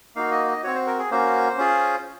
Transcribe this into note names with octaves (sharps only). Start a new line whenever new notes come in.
A#3 D#4 F#4 F5
D#5
D#5
C4 F#4 C#5
C5
A#4
G#4
A#3 C#4 F#4 C5
C#4 F4 G#4